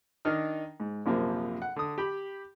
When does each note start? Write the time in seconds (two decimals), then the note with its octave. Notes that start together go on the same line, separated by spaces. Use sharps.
0.25 D#3 D4 D#4 F6
0.80 G#2
1.06 A#1 F#2 C3 F3 A#3
1.62 F#5
1.76 D3 D#6
1.98 G4 G5 B5